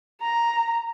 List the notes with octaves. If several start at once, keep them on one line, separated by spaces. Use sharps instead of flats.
A#5